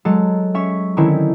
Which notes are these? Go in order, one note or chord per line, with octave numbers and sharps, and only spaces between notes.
F#3 G#3 A4
C#4 E5 C#6
D3 D#3 C4 C#4 E4